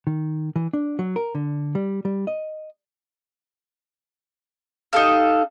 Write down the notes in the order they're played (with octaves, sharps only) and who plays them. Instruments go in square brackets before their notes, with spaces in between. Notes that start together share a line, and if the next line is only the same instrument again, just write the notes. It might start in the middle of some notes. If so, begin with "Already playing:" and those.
[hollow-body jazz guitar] D#3
E3
D4
F#3
A#4
D3
G3
G3
D#5
[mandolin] D#4 G4 A4 F5